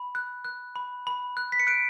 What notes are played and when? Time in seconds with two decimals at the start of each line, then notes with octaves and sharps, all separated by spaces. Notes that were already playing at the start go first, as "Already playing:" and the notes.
Already playing: B5
0.15 F#6
0.45 F#6
0.76 B5
1.07 B5
1.37 F#6
1.52 B6
1.60 C#7
1.67 F#6 D7